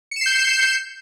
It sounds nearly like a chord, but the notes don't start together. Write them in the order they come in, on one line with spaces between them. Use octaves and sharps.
C#7 E7 C7 G6